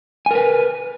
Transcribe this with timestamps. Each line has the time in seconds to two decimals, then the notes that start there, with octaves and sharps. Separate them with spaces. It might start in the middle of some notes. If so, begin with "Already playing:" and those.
0.26 G#5
0.31 A#4
0.35 B4